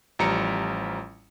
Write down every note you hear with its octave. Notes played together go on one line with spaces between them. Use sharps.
A1 F3 G3 A#5 C#7